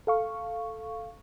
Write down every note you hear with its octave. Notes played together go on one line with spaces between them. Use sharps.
A4 F5 C#6